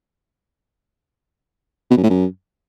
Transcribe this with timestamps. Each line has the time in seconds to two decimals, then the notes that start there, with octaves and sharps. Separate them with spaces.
1.90 B2
1.97 F#2
2.04 A2
2.10 F#2